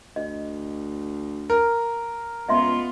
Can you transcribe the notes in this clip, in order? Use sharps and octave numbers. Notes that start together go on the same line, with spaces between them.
D2 D#5
A#4
C#2 B3 F4 D#5 E5 C6